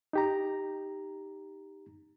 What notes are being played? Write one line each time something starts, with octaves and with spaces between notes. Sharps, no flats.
D#4 G4 A#5